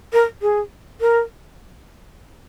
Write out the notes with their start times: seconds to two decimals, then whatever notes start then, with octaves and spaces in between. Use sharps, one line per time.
0.13 A#4
0.42 G#4
1.01 A#4